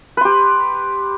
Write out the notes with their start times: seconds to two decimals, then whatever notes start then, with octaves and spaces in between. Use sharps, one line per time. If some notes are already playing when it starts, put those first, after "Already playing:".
0.17 B4
0.21 C6
0.25 G4